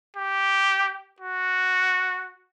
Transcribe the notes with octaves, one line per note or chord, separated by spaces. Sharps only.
G4
F#4